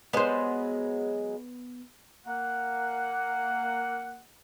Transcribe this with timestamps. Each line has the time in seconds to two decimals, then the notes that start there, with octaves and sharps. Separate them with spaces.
0.13 F#3 G#3 B3 C5
2.27 A#3 F#5